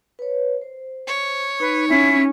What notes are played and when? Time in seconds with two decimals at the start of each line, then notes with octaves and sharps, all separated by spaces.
0.19 B4 C#5
0.62 C5
1.08 C#5
1.60 D#4 B4
1.89 C#4 E4